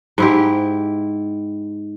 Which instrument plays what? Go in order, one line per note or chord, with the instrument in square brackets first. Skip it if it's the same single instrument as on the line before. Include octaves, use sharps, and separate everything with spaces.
[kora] G#2 E4 G4